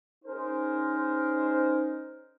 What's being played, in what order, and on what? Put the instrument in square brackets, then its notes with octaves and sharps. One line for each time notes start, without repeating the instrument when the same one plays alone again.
[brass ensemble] C#4 D#4 G#4 A#4 C5